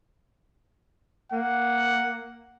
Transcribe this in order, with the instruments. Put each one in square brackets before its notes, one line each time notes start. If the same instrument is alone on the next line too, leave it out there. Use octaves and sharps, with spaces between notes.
[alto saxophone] A#3 [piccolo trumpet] F#5